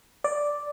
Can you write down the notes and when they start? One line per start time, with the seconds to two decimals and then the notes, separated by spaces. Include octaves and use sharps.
0.24 D5